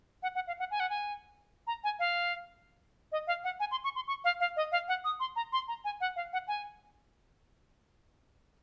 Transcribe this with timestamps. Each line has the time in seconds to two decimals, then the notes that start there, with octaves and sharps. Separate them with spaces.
0.23 F#5
0.35 F#5
0.47 F5
0.59 F#5
0.71 G#5
0.80 F#5
0.90 G#5
1.67 A#5
1.84 G#5
1.99 F5
3.12 D#5
3.27 F5
3.44 F#5
3.60 G#5
3.71 C6
3.84 C#6
3.95 C6
4.07 C#6
4.24 F5
4.40 F5
4.56 D#5
4.72 F5
4.88 F#5
5.04 D#6
5.20 C6
5.36 A#5
5.52 C6
5.68 A#5
5.84 G#5
6.01 F#5
6.16 F5
6.33 F#5
6.48 G#5